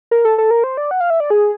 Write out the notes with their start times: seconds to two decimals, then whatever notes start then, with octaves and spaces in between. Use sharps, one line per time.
0.11 A#4
0.25 A4
0.38 A4
0.51 A#4
0.64 C5
0.77 D5
0.91 F#5
1.00 F5
1.10 E5
1.20 D5
1.30 G#4